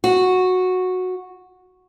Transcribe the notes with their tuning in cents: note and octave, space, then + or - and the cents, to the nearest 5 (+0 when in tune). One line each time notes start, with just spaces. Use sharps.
F#4 -10